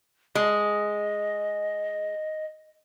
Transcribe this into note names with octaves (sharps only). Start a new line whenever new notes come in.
G#3 D#5